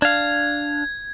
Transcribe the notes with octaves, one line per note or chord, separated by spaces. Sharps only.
D4 F5 G#6